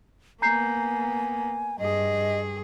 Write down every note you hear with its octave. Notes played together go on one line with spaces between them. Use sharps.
A#3 B3 G#5 A#5 G6 C7
G2 G#4 D#5